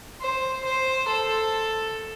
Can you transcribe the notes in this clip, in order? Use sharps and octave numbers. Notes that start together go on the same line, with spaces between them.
C5
C5
A4